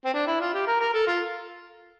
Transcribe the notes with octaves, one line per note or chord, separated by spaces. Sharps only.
C4
D4
E4
F4
G4
A#4
A#4
A4
F4